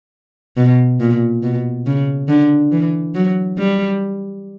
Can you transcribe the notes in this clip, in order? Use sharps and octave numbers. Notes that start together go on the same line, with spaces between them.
B2
A#2
B2
C#3
D3
E3
F#3
G3